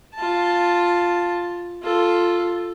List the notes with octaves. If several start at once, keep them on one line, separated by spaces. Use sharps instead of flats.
F4 A5
F4 A4